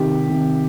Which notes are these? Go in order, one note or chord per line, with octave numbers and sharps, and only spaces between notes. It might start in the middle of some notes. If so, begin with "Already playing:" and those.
Already playing: C3 D#3 G4
C3 D#3